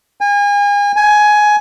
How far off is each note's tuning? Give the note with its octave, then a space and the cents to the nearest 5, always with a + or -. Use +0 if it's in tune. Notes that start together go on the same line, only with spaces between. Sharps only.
G#5 -35
G#5 +15